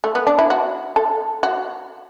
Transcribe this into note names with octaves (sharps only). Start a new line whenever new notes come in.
A3
B3
D4
E4
F#4
A4
F#4